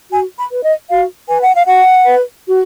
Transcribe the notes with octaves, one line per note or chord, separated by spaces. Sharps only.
F#4 G#5
B5
B4
D#5
F#4 F5
B4 G#5
F#5
F5
F#4 F#5
B4
F#4